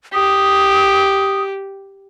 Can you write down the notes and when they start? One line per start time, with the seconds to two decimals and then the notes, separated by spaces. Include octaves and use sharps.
0.14 G4 D#6